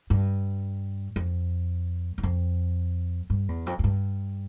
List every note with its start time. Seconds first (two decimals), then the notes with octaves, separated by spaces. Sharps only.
0.10 G2
1.16 F2
2.18 E2
2.23 F2
3.30 G2
3.48 E2
3.66 F2
3.79 F2
3.84 G2